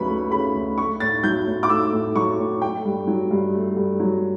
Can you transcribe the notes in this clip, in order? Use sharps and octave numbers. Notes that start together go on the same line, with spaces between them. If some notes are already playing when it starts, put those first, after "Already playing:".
Already playing: D2 C#3 F#3 B4 B5 C#6
A3
C#3 B5
D2
A3 C#6
A2 A6
F#3 G6
A2
D6
A3 E6
A2
F#3 C#6
A2
A3 G5
G2
F#3
G2
A3
G2
F#3